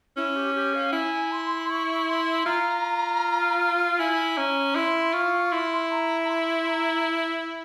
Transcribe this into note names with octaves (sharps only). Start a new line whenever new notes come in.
C#4 E4
G4
G4
F5
E4 G#5
C6
C#6
C6
F4 A#5
E4 G#5
C#4 A#5
E4 C6
F4 C#6
E4 C6
A#5
A#5
C6
A#5